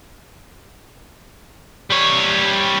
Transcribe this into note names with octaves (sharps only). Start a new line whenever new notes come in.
G3 C#5